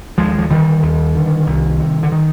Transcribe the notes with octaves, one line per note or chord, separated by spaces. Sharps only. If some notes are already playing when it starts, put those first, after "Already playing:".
D#2 F3 G#3
F3
D3 D#3 G3
D#2
D3
C2
C3
D3
D#3